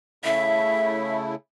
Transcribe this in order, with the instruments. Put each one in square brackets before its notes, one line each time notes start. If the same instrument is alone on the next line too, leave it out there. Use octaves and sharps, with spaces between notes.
[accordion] C#3 A3 E4 [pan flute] E5